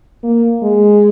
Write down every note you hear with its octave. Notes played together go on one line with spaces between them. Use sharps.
A#3
G#3